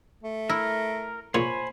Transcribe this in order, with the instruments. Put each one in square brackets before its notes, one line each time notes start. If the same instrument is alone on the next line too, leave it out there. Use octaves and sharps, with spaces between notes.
[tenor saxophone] A3
[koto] E4 [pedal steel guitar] A#4
[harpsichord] A#2 G#4 [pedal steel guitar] C5 G#5 B5 [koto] C#5